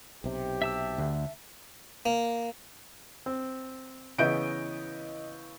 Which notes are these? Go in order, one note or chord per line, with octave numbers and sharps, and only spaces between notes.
B1 C3 G4
E5 A5 E6
D2
A#3
C4
C#3 E3 B3 D#5 G6 D7